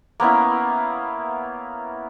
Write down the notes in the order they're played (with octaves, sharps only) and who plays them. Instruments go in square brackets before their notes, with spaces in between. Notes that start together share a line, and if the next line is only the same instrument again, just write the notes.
[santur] A#3 B3 C#4 E4